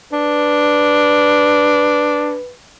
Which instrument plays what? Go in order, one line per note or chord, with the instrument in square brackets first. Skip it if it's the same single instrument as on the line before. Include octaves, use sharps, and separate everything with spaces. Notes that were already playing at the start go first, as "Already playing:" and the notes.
[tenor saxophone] D4 [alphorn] B4